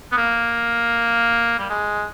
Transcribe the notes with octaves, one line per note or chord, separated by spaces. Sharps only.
B3
A#3
G3
G#3